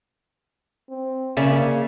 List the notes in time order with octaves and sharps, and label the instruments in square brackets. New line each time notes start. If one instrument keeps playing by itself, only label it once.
[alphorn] C4
[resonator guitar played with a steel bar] C#3 [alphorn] A#3 [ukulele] C#5 D5 E5